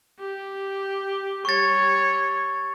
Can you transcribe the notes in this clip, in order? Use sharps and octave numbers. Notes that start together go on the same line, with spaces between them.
G4
G3 C#5 C#6 A6